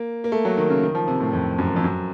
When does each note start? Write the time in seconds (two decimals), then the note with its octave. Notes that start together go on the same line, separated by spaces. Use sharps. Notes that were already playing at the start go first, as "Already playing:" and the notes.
Already playing: A#3
0.24 A#3
0.32 A3
0.45 F#3
0.57 D#3
0.70 C#3
0.83 D#3
0.95 F3
1.08 C3
1.20 A2
1.33 F2
1.58 F#2
1.76 F2
1.84 F#2